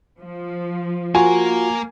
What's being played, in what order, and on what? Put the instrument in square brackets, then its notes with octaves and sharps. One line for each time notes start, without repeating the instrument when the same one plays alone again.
[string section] F3
[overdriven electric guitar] A#3 A#4 [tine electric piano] F4 F#4 [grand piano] G#5